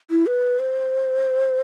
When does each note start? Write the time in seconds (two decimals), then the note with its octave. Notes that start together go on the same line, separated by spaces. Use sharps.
0.10 E4
0.26 B4
0.59 C5